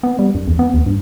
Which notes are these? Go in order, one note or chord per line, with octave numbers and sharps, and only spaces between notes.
B3
G3
F#2
E2
B3
D#2
G2